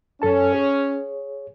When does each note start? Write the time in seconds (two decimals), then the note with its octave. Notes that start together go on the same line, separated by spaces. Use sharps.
0.22 F#2 C#4 A4 A5
0.53 G#4 C#5